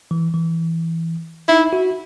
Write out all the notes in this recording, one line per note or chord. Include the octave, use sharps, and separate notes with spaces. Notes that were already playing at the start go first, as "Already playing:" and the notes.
E3
E3
D#4 E4
F#4